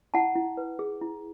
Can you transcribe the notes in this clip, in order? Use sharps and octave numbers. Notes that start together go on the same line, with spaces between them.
E4 F#5 A5
E4
B4
G#4
E4